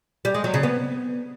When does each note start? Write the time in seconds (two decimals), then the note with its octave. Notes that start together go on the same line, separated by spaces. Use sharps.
0.25 G3
0.34 G#3
0.44 F#3
0.54 C#3
0.63 B3